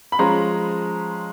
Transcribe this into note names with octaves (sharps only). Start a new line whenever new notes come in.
B5
F3 G#3 C#4 A#5 C6